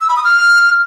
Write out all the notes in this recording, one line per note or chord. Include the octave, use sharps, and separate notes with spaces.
E6
B5
D#6
F6